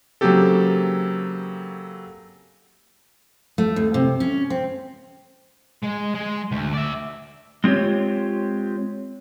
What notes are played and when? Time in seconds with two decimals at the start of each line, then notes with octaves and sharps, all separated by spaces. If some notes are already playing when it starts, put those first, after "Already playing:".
0.21 C#3 F#3 A#3 C4 G4 A4
3.58 A3
3.76 D#2
3.94 C3
4.20 C#4
4.50 C4
5.83 G#3
6.14 G#3
6.52 D2
6.74 D5 E5
7.64 G#3 C4 F4 G4 C#5